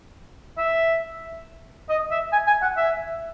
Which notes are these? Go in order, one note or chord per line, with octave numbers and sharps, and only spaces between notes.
E5
D#5
E5
G#5
G#5
F#5
E5